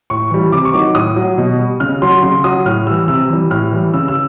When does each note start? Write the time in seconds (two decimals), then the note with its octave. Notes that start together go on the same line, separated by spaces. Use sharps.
0.10 A2 C#6
0.31 E3 G3
0.52 C3 D6
0.65 C#6
0.73 D#3 F#3 D6
0.95 A2 D#6
1.16 F#3
1.38 B2
1.59 G3
1.80 C#3 F6
2.02 F#3 C6
2.23 C#3 C6
2.44 F#3 D#6
2.66 A2 F6
2.87 E3 G3 E6
3.08 C3 E6
3.30 E3 G3
3.51 A2 F6
3.72 E3 G3
3.94 C#3 E6
4.08 E6